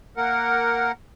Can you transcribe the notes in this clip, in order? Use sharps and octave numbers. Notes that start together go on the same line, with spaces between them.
A#3 A#4 F#5